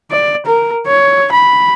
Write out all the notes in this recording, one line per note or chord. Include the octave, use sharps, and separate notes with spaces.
D5
A#4
C#5
B5